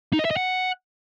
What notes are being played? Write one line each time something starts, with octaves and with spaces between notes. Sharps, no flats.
D#4
D#5
E5
D#5
F#5